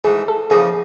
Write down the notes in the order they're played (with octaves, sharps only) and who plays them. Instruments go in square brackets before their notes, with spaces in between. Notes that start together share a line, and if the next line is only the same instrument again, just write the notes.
[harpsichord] G#2 E3 A3 [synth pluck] G#4
[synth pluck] A4
[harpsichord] E2 C#3 F3 A#3 D#4 [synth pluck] G#4